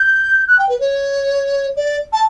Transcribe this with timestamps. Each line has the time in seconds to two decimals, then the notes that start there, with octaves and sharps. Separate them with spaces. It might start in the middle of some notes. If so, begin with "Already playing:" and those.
Already playing: G6
0.48 F#6
0.59 G5
0.69 B4
0.80 C#5
1.77 D5
2.13 A5